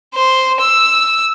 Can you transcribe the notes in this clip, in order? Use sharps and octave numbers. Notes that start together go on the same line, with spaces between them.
C5
E6